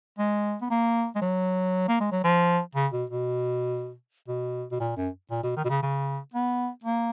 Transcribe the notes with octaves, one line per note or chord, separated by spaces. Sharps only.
G#3
B3
A#3
G#3
F#3
A#3
G#3
F#3
F3
C#3
B2
B2
B2
B2
A#2
F#2
A#2
B2
D#3
B2
C#3
C#3
B3
A#3